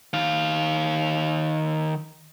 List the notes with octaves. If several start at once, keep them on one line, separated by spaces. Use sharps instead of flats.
D#3 F5